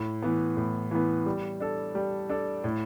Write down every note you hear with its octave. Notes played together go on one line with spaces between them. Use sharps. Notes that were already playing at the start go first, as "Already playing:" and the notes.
Already playing: A2
E3 B3
A2
E3 B3
G3
D4 A4
G3
D4 A4
A2